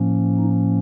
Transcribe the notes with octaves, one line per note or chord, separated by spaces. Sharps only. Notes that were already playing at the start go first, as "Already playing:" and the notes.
Already playing: A2 F3 A#3 C#4
D#4